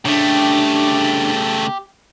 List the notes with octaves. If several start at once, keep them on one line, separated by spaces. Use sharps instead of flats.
C#3 A3 D4 G4